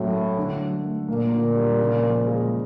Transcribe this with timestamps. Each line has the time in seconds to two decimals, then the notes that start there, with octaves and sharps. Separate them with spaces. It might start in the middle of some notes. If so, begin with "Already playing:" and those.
Already playing: A2 F#3 C#4
0.13 A3
0.37 D3
0.61 F#3
0.85 A3
1.08 A#2 A#3
1.32 D3
1.56 G3
1.79 C#3
2.03 F3
2.27 G#3